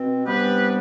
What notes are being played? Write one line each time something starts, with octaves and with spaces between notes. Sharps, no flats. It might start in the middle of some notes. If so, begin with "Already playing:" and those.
Already playing: B2 C4
C3 G3 B3 D4 G4 B4